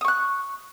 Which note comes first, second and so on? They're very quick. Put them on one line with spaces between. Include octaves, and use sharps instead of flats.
D#6 C#6 F#6